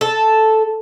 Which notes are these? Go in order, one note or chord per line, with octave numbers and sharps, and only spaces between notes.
A4